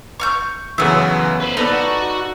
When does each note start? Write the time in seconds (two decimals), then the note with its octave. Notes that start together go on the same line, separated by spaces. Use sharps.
0.20 C#6 F6 G6
0.78 F#2 C#3 E3 A3 B3 E6
1.40 B4 C5
1.57 B3 D#4 A4 B4 D5
1.72 F#4